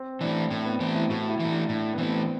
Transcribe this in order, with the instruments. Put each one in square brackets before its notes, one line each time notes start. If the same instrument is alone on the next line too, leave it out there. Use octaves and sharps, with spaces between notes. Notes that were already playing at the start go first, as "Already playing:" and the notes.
Already playing: [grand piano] C4
[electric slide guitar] E3 A3 [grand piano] D4
[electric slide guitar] A2 [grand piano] C4
[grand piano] B3
[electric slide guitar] E3 A3 [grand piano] C4
[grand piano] E4
[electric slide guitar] A2 [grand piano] F#4
[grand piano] E4
[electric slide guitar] E3 A3
[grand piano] D4
[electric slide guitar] A2 [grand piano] D4
[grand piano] B3
[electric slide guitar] E3 A3 [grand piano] C4